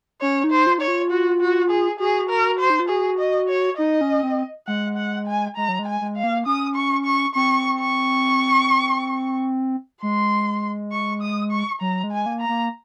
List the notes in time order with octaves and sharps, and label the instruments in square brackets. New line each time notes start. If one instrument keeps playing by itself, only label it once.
[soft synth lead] C#4 [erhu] C#5
[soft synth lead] D#4
[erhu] C5
[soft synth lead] F4
[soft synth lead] D#4 [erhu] C#5
[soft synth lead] F4
[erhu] F#4
F#4
G#4
[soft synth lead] F#4 [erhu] G#4
[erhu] A#4
C5
[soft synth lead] D#4
F4
[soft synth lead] F#4 [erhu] G#4
[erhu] D#5
C#5
[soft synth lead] D#4 [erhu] D#5
[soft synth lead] C#4
C4
[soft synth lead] G#3 [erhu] F#5
[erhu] F#5
G#5
[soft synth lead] G#3 [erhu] A#5
[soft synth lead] F#3
G#3
[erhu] G#5
[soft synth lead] G#3
[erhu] F5
[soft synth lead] A#3
[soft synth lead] C#4 [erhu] D#6
[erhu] C#6
C#6
[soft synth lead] C4 [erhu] C#6
[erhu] C#6
[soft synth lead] G#3 [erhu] C6
[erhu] C#6
D#6
C#6
[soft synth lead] F#3 [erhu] A#5
[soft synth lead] G#3
[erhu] G#5
[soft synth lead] A#3
[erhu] A#5
[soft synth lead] A#3